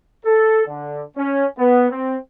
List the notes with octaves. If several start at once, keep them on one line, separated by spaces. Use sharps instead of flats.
A4
D3
C#4
B3
C4